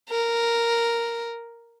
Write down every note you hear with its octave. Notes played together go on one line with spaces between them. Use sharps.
A#4